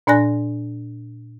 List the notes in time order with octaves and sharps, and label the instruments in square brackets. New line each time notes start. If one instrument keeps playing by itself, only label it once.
[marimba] A#2 D4 D5 G#5 F#6 A#6